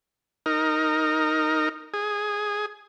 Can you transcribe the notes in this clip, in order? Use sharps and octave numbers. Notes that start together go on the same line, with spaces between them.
D#4 A#4
G#4